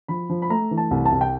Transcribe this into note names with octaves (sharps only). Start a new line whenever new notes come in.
F3 B5
F3
B5
A3 A#5
E3
A5
C2
A5
C2
G5